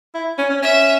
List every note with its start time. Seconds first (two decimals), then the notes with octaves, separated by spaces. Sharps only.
0.15 E4
0.38 C#4
0.50 C#4
0.62 C#4 E5